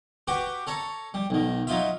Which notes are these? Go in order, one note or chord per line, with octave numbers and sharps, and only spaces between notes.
F#4 G4 B4 G5
A4 C#5 A#5
G3
B1 D#3
F#3 D#4 F4 E5